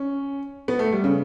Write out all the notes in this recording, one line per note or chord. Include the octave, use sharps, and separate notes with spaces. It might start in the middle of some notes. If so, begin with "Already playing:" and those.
Already playing: C#4
B3
A3
G3
C#3